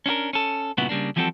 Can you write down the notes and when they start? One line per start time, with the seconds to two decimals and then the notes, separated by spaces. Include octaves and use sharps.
0.06 C#4 D4 F#4 A#4
0.33 C#4 A4
0.77 G2 A#2 C#3 B3 E4 F#4
0.89 C#3 G3 A#3 D4
1.16 E3 F3 G3 C4 F#4 A4